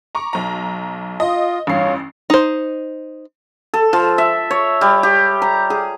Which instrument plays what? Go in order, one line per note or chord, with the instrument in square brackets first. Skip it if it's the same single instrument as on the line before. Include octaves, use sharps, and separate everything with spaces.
[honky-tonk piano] A#5 C#6 D6
B1 A#5
[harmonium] F4 [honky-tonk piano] D#5
[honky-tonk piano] A1 G2 C7 [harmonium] F4 C#5
[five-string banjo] D#4 C5
[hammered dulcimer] A4
F3
E5
C#5
G3
G4
A#5
G#4